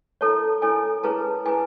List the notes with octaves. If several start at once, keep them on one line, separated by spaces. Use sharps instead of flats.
E4 A4 C#5 A5
E4 A4 C#5 G#5
E4 G#4 B4 A5
E4 G#4 B4 G#5